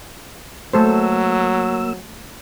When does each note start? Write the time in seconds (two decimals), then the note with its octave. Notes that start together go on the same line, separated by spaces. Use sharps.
0.73 F#3 A3 A#3 A4 C5 E6